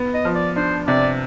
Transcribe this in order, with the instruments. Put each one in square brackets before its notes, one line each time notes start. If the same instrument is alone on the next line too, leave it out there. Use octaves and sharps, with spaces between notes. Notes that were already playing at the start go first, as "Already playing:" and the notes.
Already playing: [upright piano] B3
[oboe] D#5
[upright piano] F3
[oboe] D5
[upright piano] D4 [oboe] C5
[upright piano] C3 [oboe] D5